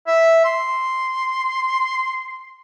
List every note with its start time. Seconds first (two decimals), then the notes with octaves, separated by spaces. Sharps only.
0.07 E5
0.45 C6